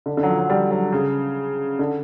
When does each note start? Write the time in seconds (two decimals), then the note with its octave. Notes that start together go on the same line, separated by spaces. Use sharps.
0.06 D3
0.17 D3
0.23 F#3
0.28 F3
0.38 F#3
0.50 G3
0.71 F#3
0.92 C#3
1.79 D3